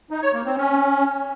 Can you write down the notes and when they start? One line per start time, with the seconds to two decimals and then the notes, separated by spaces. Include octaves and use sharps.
0.11 D#4
0.22 C#5
0.34 A#3
0.45 C4
0.57 C#4